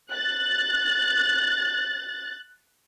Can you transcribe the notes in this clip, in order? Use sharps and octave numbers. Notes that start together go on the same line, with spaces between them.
F#6 A6